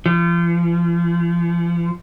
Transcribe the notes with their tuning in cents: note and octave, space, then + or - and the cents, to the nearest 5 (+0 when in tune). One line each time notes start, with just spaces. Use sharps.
F3 -40